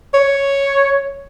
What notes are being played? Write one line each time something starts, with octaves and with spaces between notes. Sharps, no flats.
C#5